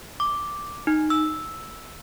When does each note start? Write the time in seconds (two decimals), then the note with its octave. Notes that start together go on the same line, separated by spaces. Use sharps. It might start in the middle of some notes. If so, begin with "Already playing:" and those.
0.20 D6
0.87 D#4
1.10 E6